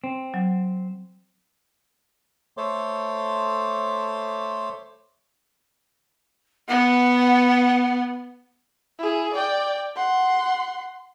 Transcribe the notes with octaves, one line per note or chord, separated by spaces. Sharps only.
C4
F#3
A3 A4 C5 C#5 C6 D6
B3 F#5
E4 G#4
D5 G5
F#5 C6